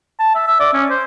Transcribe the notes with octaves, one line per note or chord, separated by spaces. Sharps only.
A5
E5
E5
D5
C#4
C5